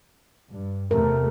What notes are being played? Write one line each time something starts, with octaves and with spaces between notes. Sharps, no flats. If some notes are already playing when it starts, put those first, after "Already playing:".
G2
E2 C3 A3 A#4